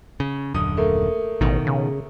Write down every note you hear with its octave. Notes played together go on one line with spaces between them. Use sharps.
C#3
D#1 F#2 D3 D#6
A3 A#3
A1 B2 D#3
C#3